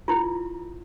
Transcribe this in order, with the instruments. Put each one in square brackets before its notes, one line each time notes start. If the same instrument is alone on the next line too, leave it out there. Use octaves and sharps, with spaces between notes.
[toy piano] E4 F4